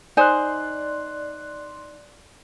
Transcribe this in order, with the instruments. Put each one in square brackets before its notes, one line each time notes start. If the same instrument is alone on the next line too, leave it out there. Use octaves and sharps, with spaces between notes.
[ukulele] D#4 C5 G#5 [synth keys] D5 C6 F#6